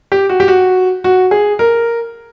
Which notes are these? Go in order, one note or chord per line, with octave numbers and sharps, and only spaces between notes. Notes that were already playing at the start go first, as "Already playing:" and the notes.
G4
F#4
G4
F#4
F#4
G#4
A#4